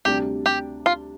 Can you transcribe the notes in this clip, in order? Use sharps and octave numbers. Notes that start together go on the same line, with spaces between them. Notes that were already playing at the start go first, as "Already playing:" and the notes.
D2 C3 G3 D4 G4
G4
F4